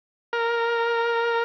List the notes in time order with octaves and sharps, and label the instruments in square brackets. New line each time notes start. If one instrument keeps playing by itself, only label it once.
[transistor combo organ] A#4